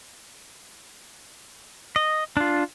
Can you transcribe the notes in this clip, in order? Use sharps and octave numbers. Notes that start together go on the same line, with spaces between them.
D#5
D4 F4